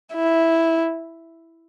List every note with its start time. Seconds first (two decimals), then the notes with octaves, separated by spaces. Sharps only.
0.15 E4